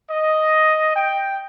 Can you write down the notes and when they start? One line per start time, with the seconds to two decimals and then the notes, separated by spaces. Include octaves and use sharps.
0.11 D#5
0.96 G5